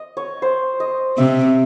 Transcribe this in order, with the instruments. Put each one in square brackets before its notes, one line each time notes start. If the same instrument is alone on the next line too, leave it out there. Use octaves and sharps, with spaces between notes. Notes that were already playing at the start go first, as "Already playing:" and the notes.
Already playing: [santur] D#5
C#5
C5
D#5
[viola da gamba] C3 [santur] E5